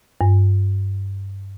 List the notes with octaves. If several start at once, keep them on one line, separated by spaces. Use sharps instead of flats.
G2